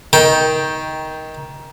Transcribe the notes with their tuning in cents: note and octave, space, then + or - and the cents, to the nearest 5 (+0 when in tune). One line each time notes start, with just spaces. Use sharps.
D#3 +15 G5 +0